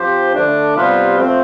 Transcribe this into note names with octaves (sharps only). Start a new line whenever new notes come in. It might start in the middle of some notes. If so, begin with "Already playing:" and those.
Already playing: F3 C4 G4 C5
D3 A3 D4
C3 G3 B3 F4 C5
F3 A3 C4